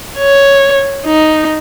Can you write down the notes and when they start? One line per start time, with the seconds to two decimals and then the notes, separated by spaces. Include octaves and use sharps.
0.18 C#5
1.06 D#4